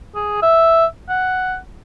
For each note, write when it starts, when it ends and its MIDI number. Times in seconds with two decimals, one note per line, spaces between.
0.15 0.40 68
0.43 0.86 76
1.09 1.57 78